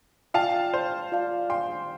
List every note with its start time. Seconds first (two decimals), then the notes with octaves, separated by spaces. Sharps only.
0.34 F4 D5 F5 G5 A5
0.74 C5
1.12 F4 D5 F5 A5
1.50 G5 C6